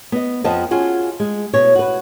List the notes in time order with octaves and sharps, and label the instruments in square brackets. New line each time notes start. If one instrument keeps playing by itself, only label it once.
[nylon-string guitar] B3 D#5
F2 F3 B3 D#5 A5
C#4 F4 F#4 G#4
G#3
B2 C#5
F#4 B4